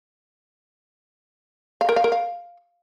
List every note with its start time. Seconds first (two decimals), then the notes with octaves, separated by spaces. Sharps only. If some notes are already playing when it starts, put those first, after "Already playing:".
1.81 F5
1.89 A#4
1.96 F5
2.04 A#4
2.12 F5